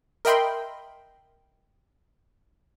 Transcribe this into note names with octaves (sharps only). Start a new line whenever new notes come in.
A#4 D#5 E5 G5 B5 C6